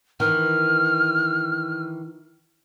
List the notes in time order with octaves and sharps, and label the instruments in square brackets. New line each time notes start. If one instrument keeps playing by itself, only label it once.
[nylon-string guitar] D#3 E3 [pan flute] F6